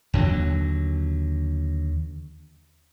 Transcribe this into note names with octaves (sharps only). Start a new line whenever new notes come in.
D#2 D3 F3 F#3